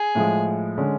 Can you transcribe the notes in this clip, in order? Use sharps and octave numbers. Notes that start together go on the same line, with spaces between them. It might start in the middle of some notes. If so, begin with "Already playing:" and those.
Already playing: G#4
A2 F3 G#3
D3 G#3 C#4